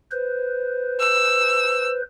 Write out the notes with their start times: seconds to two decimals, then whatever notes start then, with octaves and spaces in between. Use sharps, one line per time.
0.12 B4 C5
1.00 E6